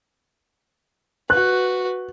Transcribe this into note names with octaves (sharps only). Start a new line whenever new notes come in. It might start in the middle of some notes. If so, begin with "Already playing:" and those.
F#4 B4 F#6